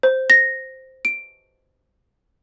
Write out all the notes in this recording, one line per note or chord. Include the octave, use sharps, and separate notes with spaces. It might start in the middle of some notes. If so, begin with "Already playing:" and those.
C5
A#6
D7